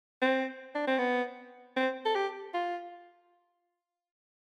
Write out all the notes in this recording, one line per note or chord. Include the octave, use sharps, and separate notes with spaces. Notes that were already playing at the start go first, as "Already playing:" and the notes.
C4
D4
C4
B3
C4
A4
G4
F4